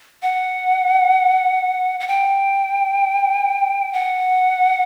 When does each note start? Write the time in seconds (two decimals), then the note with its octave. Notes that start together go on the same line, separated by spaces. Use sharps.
0.22 F#5
2.00 F#5
2.08 G5
3.93 F#5